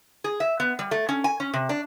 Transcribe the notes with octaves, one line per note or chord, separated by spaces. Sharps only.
G#4
E5
B3
G3
A3
C#4
G#5
C#4
C3
D4